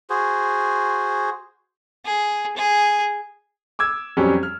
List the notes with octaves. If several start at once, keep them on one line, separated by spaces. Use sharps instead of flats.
F#4 G#4 C5
G#4
G#4
D6 E6 G#6
F2 F#3 G3 C#4 G4
F6